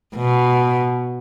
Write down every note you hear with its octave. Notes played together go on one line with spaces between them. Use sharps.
B2